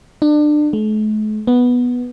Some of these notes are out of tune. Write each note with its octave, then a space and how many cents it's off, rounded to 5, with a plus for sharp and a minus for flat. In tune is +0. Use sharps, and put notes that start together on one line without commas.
D4 +30
A3 -45
B3 -5